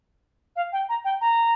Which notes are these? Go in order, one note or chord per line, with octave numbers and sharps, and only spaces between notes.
F5
G5
A#5
G5
A#5